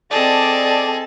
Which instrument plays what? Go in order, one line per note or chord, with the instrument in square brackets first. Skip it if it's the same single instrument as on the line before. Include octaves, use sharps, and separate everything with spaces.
[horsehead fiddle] C4 A4 [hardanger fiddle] G#4 D#5 [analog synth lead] D5 [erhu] A5